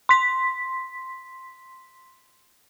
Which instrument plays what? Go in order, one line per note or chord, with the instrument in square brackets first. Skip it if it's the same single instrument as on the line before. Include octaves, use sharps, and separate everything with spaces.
[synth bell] C6 B6